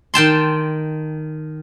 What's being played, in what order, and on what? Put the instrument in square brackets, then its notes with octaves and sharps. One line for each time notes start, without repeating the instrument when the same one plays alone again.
[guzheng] D#3 G5 A5 C6